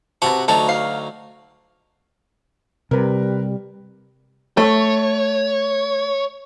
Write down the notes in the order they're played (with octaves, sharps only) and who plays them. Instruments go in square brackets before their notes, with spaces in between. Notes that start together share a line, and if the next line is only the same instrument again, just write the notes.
[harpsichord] C3 F#4 F#5 [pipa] B3 A5
[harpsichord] D2 F#3 D#4 [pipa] A4 C#5 A5
[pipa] F5
[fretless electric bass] C3 [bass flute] G3 [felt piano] A#4 B4
[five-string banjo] A3 [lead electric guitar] C#5